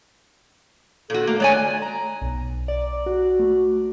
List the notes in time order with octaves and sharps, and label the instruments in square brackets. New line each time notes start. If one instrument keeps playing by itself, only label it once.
[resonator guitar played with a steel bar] A#2 F#4 [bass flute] A4
[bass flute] A3 [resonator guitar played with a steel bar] A#3
[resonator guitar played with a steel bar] G#3 D5 G#5 [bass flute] C#5
[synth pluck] A#5
B1
D5
F#4
A3